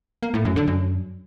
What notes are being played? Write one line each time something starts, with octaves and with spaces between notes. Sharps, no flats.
A#3
A2
F#2
D3
F#2